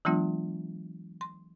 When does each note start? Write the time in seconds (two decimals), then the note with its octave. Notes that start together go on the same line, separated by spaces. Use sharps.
0.05 E3 F#3 G#3 B3 D4 F4
1.21 C6